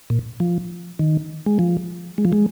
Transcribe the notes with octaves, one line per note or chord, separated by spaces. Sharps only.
A#2
F3
D#3
G#3
F3
G#3
F3
G#3